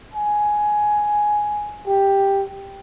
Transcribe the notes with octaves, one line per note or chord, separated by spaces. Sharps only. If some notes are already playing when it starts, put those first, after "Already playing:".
G#5
G4